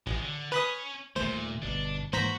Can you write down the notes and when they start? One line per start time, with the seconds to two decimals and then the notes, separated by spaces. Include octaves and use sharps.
0.07 A1 G#3 C#4
0.22 D3
0.52 C#4 B4 B5 D#6
1.16 D#1 A#2 D#3 A3 C5
1.62 G1 B2 D4
2.13 G#2 E3 A#3 F#4 C5 A#5 B6